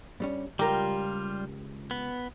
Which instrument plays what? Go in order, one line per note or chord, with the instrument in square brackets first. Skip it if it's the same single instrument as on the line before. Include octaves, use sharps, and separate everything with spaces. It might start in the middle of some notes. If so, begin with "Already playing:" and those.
[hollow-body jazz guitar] G2 G3 C#4
[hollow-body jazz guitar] C#2 [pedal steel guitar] G3 F4 [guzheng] G4 A#4
[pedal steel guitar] B3